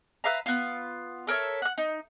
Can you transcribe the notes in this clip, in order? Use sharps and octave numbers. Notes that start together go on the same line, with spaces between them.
B4 E5 F5 A#5
B3 F4
A4 A#4 C#5 E5
F#5 F#6
D#4